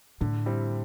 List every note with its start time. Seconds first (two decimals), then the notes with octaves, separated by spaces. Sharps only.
0.21 A2 D3
0.46 G3 C4 E4